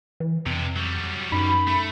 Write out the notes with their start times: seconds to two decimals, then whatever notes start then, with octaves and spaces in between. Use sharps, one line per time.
0.20 E3
0.46 F2 C3 D4
0.76 F#3 G3
1.32 F#2 D#4 B5
1.67 A3